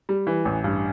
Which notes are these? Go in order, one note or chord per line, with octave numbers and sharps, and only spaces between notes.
G3
E3
A1
G2